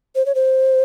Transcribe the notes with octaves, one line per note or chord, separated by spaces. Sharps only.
C5
C#5
C5